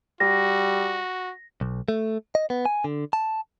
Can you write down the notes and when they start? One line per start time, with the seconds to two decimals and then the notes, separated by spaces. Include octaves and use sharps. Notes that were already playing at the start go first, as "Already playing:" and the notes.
0.20 G3 F#4 A#6
1.61 B1
1.88 A3
2.35 D#5
2.50 B3
2.65 G#5
2.84 D3
3.13 A5